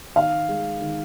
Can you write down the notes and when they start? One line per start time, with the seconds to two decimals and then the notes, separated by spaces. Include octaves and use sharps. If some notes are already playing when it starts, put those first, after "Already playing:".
0.16 D#3 F5
0.49 G#3
0.81 D#3